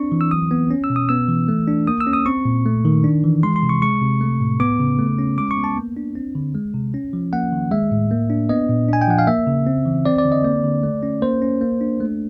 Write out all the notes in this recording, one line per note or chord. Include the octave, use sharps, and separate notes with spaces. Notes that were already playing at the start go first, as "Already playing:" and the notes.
Already playing: C4 D4 C#6
E3
E6
F#3 D#6
B3
C#4
E6
B2
D#6
B3 E6
E3
A3
D4
A#3 D#6
E6
C#4
D#6
C4 C#6
A#2
A3
D#3
D4
E3
G#3 C6
C6
C3
C#6
G#3 C#6
C3
A3
A2
B3 D6
C#3
A3
C#4
G#3 D6
C#6
B3
A5
A#3
D4
C4
D3
G#3
C3
C#4
F3
A#3 F#5
D#3
G#3 E5
A2
A#3
D4
B3 D#5
A#2
D4 G#5
G5
F3 F#5
F5
A#3 E5
C#3
C4
E3
C4 D5
D5
D3
D#5
A#3 D5
D3
A3
C#4
A#3 C5
C#4
A#3
D4
A3